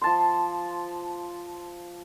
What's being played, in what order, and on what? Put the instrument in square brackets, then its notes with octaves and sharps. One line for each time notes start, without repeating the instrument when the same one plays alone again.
[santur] F3 A5 C6